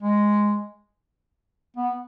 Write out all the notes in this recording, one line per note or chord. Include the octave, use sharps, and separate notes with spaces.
G#3
B3